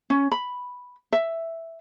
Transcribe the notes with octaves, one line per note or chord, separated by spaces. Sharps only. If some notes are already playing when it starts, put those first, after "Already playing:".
C#4
B5
E5